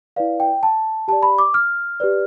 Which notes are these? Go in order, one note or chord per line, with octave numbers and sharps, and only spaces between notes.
E4 B4 D5 F5
G5
A5
G4 D5 A5
B5
D6
F6
G4 B4 D5